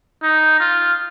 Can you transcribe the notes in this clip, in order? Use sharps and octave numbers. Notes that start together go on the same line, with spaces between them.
D#4
F4